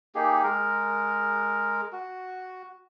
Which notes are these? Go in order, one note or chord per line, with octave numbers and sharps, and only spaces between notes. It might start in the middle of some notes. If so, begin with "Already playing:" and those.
A#3 D#4 G4 G#4
G#3 A#4
F#4